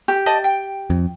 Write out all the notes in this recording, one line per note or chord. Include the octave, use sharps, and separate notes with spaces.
G4
D5 D#5 A5
G5
F2